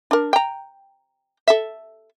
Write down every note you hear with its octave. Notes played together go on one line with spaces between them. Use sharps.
D4 A#4
G5 A#5
A4 E5